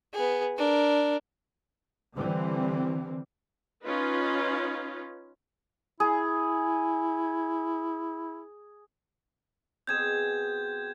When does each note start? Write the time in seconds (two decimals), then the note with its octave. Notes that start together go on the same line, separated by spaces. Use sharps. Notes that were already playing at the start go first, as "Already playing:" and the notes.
0.14 B3 G#4
0.59 D4 A#4
2.15 D3 E3 G3 C4
3.86 C#4 D#4 F4 B4
6.00 E4 G#4
9.87 B2 C4 G#4 G6 G#6 E7